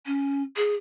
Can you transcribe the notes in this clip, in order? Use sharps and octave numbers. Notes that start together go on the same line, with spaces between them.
C#4
G#4